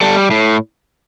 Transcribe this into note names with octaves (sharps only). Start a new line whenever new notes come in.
G3 A4
A2